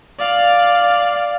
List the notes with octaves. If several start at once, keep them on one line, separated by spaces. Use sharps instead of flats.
D5 F5